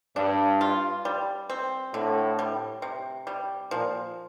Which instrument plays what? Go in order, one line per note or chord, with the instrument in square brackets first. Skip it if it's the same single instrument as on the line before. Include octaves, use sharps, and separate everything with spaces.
[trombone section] G2 [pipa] D4
[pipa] F4
G3
C4
[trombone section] A2 [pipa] D3
[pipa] G3
C3
G3
[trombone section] A#2 [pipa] F3